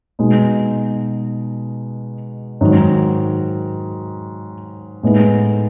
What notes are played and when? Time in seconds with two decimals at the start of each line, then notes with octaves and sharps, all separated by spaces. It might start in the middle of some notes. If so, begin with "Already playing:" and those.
0.19 B2 G#3 D#4
2.61 G#2 D#3 F#3
5.03 A2 G#3 B3 D#4